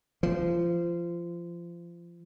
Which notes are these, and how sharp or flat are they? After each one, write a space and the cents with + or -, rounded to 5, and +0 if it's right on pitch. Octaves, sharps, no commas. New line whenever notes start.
F3 -25